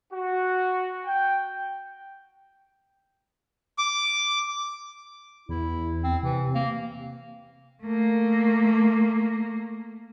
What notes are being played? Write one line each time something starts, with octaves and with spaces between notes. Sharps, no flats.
F#4
G5
D6
E2 E4
C4
C3 E3
A#3
A3 A#3